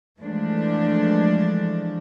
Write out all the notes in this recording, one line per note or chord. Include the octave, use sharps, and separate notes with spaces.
E3 F3 G#3 A3 D4